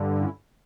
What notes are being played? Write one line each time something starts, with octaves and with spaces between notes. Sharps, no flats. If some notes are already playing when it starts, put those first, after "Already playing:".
Already playing: G2 D3
C#4 E4